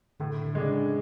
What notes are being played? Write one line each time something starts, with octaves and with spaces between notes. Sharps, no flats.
A2 D3
D3
C#3 G#3 D4